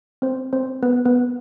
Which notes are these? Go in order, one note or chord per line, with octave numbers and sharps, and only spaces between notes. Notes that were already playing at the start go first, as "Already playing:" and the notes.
C4 C5
C4 C5
B3 B4
B3 B4